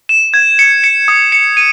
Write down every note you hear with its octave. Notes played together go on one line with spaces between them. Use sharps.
E7
G#6
C#7
C#7
D#6
C#7
D#7